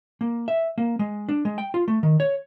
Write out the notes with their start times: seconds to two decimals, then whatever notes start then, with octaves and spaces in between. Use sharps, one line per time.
0.21 A#3
0.48 E5
0.78 A#3
0.99 G#3
1.29 D4
1.45 G#3
1.58 G5
1.74 F4
1.88 A3
2.03 D#3
2.20 C#5